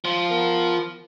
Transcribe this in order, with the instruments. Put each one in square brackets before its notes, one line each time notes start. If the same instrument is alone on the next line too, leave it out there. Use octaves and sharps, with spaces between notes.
[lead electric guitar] F3 F4
[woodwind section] B3 A#4